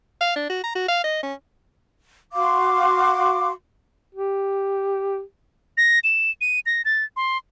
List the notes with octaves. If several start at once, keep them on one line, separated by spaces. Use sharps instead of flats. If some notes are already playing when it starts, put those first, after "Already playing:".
F5
D4
F#4
A#5
F#4
F5
D#5
C#4
F#4 F5 C6 D6
G4
A#6
E7
D#7
A#6
A6
C6